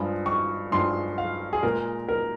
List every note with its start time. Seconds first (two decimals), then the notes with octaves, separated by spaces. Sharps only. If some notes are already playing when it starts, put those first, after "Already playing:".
Already playing: G2 F3 G#3
0.26 C#6
0.72 G2 F3 G#3 C6
1.18 F5
1.53 G#4
1.63 A#2 G#3 A#4
2.08 A#4